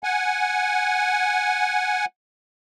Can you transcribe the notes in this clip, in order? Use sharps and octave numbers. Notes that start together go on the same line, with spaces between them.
F#5 G#5